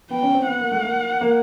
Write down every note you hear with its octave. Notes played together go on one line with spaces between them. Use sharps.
B3 G5
C#4
C4
B3 F#5
A#3
A3
A#3
A#3